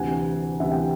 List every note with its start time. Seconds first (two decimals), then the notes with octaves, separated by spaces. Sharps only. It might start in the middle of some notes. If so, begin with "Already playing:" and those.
Already playing: D2 C3 E3 F#5 G#5
0.60 D2 C3 E3 E5 F#5
0.72 G5